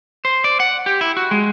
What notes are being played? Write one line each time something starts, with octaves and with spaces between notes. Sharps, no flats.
C5
D5
F#5
G4
E4
F#4
G#3